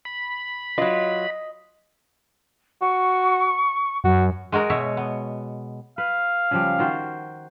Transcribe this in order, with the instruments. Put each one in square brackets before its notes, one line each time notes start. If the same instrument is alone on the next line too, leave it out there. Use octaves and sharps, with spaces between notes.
[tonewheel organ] B5
[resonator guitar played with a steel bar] F#3 F4 [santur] D#5
[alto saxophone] F#4 [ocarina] C#6
[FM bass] F#2 [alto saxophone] F#4
[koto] G#3 F#4 G#4 A#4
B2 C#5 E5
B3
[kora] B4 [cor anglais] F5
[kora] C#3 F3 G3
D#3 F#4 C5